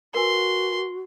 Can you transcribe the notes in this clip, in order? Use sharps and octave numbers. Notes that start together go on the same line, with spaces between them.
F#4 A#4 B4 G#5 C6